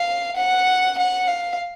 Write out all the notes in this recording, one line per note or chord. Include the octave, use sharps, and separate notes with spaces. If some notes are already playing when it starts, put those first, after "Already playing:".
Already playing: F5
F#5
F#5
F5